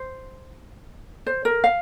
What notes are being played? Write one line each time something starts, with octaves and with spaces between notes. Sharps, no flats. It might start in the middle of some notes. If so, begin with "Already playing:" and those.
Already playing: C5
C5
A#4
F5